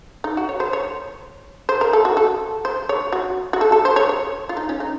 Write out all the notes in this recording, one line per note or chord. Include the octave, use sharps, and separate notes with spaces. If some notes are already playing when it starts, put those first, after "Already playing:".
D#4
F#4
C#5
C5
C#5
C5
A#4
A4
F#4
A4
C5
C#5
F#4
F#4
A4
A4
C5
C#5
C#5
F4
D#4
C#4
D#4